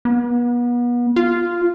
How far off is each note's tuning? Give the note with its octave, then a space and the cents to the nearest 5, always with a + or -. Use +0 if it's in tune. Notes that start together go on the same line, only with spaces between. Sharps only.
B3 -35
F4 -5